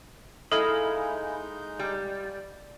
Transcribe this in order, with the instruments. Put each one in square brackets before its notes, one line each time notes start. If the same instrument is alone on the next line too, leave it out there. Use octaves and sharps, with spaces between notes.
[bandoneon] G#3 D#4 G6 [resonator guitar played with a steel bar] E4 [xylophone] A4 [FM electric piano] D#5 F5 G#5
[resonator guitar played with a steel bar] G3